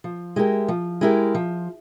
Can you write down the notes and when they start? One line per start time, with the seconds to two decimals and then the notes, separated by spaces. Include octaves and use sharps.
0.04 F3
0.36 G#3 E4 G4 A#4
0.68 F3
1.01 G#3 E4 G4 A#4
1.35 F3